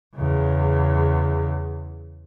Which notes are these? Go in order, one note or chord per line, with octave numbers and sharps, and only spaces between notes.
E2 C#3